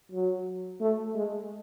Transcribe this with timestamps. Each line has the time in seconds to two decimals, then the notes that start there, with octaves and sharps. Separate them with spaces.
0.12 F#3
0.81 A3
1.15 G#3